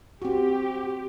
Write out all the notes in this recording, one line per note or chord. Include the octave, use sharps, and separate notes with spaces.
C4 F#4 G4